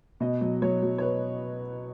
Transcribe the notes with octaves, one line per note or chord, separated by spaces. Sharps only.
B2 D#5
F#3
F#3 C#5
F#3
C#5
B4